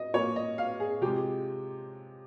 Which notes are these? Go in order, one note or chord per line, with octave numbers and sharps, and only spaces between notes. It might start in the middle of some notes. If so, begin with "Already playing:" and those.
Already playing: D#5
A#2 F3 A#3 C#5
D#5
F5
G#4
C3 F3 G#3 G4